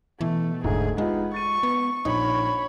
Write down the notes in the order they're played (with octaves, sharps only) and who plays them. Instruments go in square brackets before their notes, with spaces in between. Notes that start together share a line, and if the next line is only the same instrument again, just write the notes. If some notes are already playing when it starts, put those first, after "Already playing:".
[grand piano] B2 [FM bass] E3 [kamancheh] A3
[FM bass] F1 [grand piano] D2 G#2 [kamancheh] G#4
[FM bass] G#3 [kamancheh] B3 [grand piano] D#4 F4 G4
[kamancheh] C#6 [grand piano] A6 D#7
[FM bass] B3
[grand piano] A#1 [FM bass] D#4 [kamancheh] C#5 B5